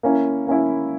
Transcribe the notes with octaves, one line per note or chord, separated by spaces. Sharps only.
A#3 C#4 E4
A#3 C#4 E4